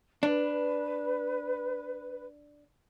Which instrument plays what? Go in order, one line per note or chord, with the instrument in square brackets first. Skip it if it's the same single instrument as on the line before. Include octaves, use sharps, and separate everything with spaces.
[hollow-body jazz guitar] D4 [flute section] B4